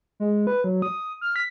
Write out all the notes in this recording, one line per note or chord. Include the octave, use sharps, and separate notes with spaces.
G#3
B4
F#3
D#6
F6
B6